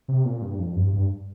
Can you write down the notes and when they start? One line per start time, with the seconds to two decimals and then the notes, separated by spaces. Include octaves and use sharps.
0.08 C3
0.25 A#2
0.42 G2
0.59 F2
0.76 G2
0.93 G2